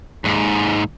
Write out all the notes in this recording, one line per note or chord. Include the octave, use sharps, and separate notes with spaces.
D#2 G#2